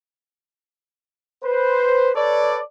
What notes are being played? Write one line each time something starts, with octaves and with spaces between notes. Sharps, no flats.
B4 C5
A4 B4 C#5 D5